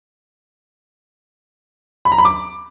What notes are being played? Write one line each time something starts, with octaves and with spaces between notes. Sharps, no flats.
B5
A#5
B5
D6